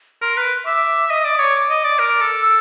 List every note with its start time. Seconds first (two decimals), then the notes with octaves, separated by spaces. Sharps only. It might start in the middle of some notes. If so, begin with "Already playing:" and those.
0.22 A#4 C6
0.37 B4
0.44 C6
0.65 E5 D6
1.10 D#5 D#6
1.24 D5
1.32 D#6
1.36 C#5 D6
1.69 D#5
1.84 D5
1.99 A#4
2.21 A4
2.43 E6